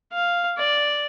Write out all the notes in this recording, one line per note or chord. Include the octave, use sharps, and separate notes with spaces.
F5
D5